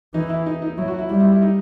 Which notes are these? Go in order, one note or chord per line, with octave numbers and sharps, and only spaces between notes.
E3 D#4
E4
D#4
D#4
F#3 E4
F#4
E4
G3 E4
E4
E4
D#4